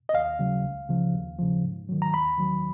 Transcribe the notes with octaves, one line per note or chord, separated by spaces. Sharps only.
D#5
D#2 F5
C#3 F#3
C#2
C#3 F3
D#2
C#3 F3
G#2
D#3 F#3
A#5
D#2 B5
D#3 F#3